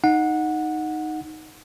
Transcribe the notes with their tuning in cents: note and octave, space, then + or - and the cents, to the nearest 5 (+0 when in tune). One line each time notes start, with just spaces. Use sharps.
D#4 +0 F#5 -15